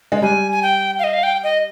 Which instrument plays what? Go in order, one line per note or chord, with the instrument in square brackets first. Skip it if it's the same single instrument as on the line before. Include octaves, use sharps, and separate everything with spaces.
[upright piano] G#3
[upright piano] G3 [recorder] G#5
[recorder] G#5
G5
F5
D#5
F5
G5
D#5